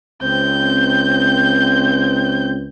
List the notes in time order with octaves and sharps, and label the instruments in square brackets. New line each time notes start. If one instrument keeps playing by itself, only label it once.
[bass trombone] C#2 [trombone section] C4 [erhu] G6